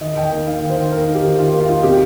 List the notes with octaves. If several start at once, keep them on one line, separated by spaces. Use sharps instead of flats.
D#3 D#5
D#3 G5
A#3
D#4 F5
D#3
C5
D#3
A#3 A#4
D#4
G4
D#3
D#3 F4
A#3
F4
D#4
C3 G4